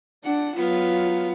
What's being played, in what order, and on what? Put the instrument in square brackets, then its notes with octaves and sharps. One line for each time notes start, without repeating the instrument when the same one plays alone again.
[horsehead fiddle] D4 [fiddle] F#5
[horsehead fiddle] F#3 F4 [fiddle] B3 F5